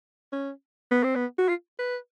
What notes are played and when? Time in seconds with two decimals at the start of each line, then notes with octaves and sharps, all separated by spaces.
0.33 C#4
0.91 B3
1.04 C4
1.16 B3
1.38 F#4
1.49 F4
1.79 B4